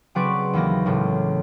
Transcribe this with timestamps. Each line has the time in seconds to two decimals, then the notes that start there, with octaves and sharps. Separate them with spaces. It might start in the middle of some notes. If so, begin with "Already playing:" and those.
0.15 C#3 F#3 C4 B4 D5 C#6
0.53 D#2 E3 A#3 A#6
0.86 C#2 A2 C#3